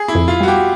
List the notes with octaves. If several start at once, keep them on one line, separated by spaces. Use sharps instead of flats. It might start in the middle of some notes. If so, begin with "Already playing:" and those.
Already playing: G#4
E4
F2
F4
G3 F#4
G4